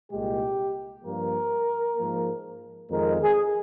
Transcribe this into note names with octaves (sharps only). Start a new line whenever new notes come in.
C2 A#2 G#3 G4
G2 F3 A#3 A#4
G#2 F3 A#3
F2 D#3 G#3 A#4
G#4